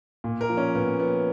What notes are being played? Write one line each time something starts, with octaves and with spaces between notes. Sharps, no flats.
A#2
A#4
F3
C#4
A#2 B3
F3 B3